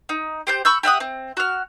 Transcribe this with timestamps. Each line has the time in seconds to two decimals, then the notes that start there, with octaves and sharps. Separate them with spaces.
0.09 D#4
0.47 G4 C5 G6
0.65 B5 C#6 E6 G6
0.83 G4 E5 F#5 D#6
1.00 C4
1.37 F#4 F6